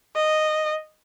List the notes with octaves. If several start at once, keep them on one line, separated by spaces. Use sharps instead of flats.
D#5